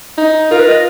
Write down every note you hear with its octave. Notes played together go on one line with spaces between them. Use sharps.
D#4
F4 A#4
B4
D#5